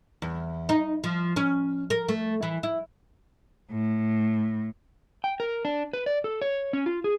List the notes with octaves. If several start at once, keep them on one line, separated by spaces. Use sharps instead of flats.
E2
D#4
F3
C#4
A#4
A3
E3
E4
A2
G5
A#4
D4
B4
D5
A4
C#5
C#4
F4
G#4